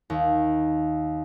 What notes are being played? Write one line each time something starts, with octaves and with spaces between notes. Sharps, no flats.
D#2